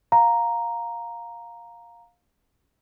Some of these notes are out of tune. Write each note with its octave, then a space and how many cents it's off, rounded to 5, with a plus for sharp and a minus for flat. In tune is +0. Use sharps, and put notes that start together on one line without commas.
F5 +15 A#5 +0